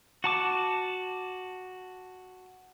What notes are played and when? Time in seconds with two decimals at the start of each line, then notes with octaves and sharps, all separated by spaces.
0.24 F#4 A5 D6